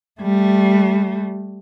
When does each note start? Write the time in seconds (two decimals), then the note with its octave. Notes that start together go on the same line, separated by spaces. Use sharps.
0.21 G3 A3